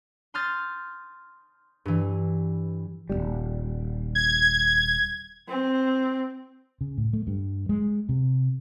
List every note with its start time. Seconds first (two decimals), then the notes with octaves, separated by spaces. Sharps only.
0.34 C6 D#6 F6 G6 A6
1.85 G2 E3
3.10 D#1 A#1 G3
4.15 G#6
5.48 C4
6.81 C#3
6.98 A2
7.13 A3
7.27 G2
7.69 G#3
8.09 C3